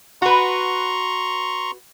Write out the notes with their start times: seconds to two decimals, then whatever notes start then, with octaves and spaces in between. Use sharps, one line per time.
0.22 F#4 B4 A#5 C6 C#6